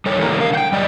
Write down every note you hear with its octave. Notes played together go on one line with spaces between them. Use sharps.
G3 A4 C#5
E3 G3 A#3 A#4
D3 F5
F#5 G5
F#2 G3 D5 D#5 G5